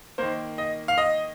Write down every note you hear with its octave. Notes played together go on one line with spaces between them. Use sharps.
D#3 A#3 C5
D#5
F5
D#5